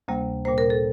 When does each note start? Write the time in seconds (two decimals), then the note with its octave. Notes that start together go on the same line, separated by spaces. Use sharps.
0.08 D2 C3 G3 A#3
0.45 A#2 G3 A#3 C5
0.58 A#4
0.70 A4